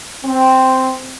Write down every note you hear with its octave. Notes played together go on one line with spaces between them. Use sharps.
C4